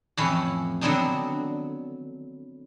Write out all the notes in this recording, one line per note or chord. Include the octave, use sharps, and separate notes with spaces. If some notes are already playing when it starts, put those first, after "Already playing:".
F2 A2 E3 C#4 E4
D3 F#3 B3 C4 D4 D#4